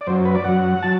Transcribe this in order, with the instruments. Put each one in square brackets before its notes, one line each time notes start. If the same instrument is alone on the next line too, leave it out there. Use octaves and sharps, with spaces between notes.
[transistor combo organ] D5
F#2 F#3 C5
B4
D5
F#2 F#3 F#5
F#3 A5